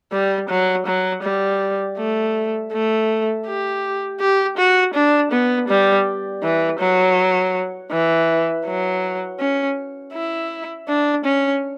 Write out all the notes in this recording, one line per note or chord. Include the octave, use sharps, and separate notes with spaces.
G3
F#3
F#3
G3
A3
A3
G4
G4
F#4
D4
B3
G3
E3
F#3
E3
F#3
C#4
E4
D4
C#4